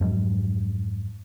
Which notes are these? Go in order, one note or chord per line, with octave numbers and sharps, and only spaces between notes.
F2 G#2 F#3